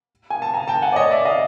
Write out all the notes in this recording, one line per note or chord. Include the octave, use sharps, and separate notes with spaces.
G#5
A5
G#5 A#5
G5 A5
F#5 G#5
D5
C#5 D#5
D5 E5
D#5 F5